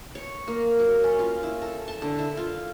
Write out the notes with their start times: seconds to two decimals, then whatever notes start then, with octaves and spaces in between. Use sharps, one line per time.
0.15 C#5
0.48 A#3
0.79 F#3
1.04 C#4
1.19 F4
1.43 E4
1.62 A4
1.88 A5
2.02 D3
2.19 E4
2.37 F4